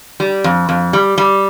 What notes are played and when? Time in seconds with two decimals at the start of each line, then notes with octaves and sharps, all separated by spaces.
0.20 G3
0.44 F2
0.69 F2
0.93 G3
1.18 G3